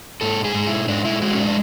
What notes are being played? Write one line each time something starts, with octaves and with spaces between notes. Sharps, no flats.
G#2 A4
G#4
G#2
E4
G#2 D4
E4
G#3 F#4
C#4
D4